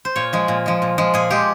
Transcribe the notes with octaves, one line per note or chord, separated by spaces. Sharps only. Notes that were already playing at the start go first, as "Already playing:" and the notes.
C5
A#2 C#5
F3 G#3
A#2
F3 G#3
A#2
F3 G#3
A#2 G#4
F3 G#3 G4